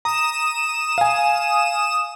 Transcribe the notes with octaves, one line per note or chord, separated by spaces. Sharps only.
A#5 D#6 E7
F5 G#5